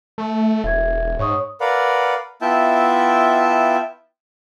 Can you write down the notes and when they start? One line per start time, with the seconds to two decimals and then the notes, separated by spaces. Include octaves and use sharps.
0.18 A3
0.64 E1 E5 G#6
1.19 G#2 C#5 C#6 D#6
1.61 A#4 B4 D5 F5 F#5
2.42 B3 E4 F4 E5 G5 A5